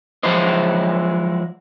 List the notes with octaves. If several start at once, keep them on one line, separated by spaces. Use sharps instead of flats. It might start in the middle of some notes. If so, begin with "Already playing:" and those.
F3 F#3 G#3 E4 C5 D#5